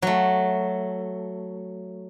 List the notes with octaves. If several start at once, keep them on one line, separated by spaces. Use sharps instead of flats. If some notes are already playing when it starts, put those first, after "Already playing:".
F#3 A3